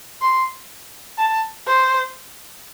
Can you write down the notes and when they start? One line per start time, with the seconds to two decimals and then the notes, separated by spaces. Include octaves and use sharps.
0.21 C6
1.18 A5
1.67 C5